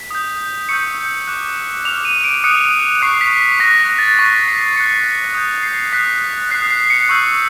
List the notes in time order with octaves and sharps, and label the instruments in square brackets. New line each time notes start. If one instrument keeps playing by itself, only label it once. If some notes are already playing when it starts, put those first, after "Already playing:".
Already playing: [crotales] B6
D#6 G6
C#6 E6 G6 C#7
D6 F#6
D6 F6 F7
D#7
D7
D#6 F#6 C#7
C#6 F#6 C7
B6
B6
C#6 F#6 A#6
A#6
A6
C#6 F#6 B6
C7
C#6 F#6 C#7
D#6 G6
C7
D#6 F#6 B6
D#6 F#6 C7
C7
C#7
C#6 E6 G6